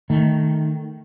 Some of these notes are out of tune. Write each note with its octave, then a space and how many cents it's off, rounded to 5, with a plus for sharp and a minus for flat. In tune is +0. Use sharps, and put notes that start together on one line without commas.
D#3 +0 A3 +0